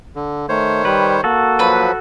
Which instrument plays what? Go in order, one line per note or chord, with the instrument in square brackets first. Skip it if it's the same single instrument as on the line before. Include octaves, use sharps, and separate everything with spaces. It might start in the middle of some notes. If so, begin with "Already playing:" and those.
[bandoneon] D3
[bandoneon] D#3 C5 C#5 [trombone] A3
[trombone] G3 [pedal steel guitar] B4
[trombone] A#3 [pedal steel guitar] F#4 A4
[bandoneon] F3 F#3 [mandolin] B4 B5